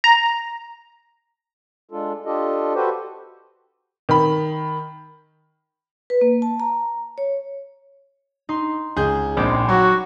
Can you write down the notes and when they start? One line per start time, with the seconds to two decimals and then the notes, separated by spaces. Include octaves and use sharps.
0.04 A#5
1.91 G#3 D4 F4 A4
2.25 D4 F4 G4 A4 D#5
2.75 F#4 G4 A4 B4 C5
4.09 D#3 B5
6.10 B4
6.21 A#3
6.42 A5
6.60 A#5
7.18 C#5
8.49 D#4 C6
8.97 C#2 G#4 G6
9.37 A#1 G#3 C4 G5 B5 D6
9.69 F#3 F#4